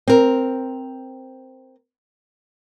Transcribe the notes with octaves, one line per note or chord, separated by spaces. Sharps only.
C4 A#4